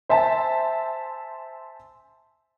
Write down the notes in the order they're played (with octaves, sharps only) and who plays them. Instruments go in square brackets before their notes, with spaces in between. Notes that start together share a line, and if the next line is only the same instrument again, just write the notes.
[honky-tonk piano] C5 E5 G#5 A5